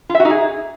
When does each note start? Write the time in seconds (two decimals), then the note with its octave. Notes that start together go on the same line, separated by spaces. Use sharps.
0.09 F4
0.15 E5
0.20 F#4
0.25 D#4
0.30 G#4